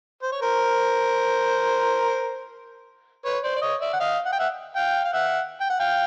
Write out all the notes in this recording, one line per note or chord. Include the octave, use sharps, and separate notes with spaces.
C5
C#5
A#4 C5
B4 C#5
C5 D5
D5
C#5 D#5
D5 E5
F#5
D#5 F5
F#5
G5
E5 F#5
F5 G5
F5
E5 F#5
G5
F#5
F5 G5